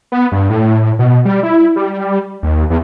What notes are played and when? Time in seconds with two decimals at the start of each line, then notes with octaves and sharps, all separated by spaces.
0.12 B3
0.32 G2
0.50 A2
0.99 B2
1.25 G3
1.43 E4
1.76 G3
2.43 D#2
2.70 E2